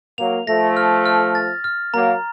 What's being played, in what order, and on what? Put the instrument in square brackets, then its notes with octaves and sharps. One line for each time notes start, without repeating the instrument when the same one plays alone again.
[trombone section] F#3 A#3 [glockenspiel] F7
[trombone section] F3 A3 [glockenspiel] A#6
[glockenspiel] F6
F6
A6
F6
[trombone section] F#3 A#3 [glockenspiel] A#5